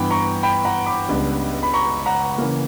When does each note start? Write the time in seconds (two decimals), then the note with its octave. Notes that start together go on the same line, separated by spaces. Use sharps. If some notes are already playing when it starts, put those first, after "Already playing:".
Already playing: G2 E3 B3 G5 B5
0.11 A#5 C#6
0.43 G5 B5
0.65 F#5 A#5
0.86 B5 D6
1.08 C#2 C#3 G3 B3 D4
1.63 B5
1.74 A#5 C#6
2.06 F#5 A#5
2.38 C#3 E3 A#3